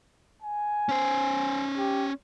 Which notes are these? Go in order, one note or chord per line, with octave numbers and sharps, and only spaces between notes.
G#5
C#4 C5
G4